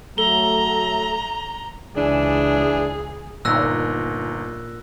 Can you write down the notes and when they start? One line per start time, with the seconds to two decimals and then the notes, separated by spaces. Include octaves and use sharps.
0.18 F#3 A3 A4 A#5 G7
1.97 C#2 E3 D4 G#4
3.45 G1 A#2 D#4 E6 F#6 A#6